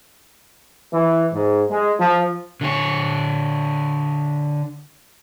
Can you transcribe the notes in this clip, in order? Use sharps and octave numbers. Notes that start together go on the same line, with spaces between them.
E3
G#2
G#3
F3
D3 C#5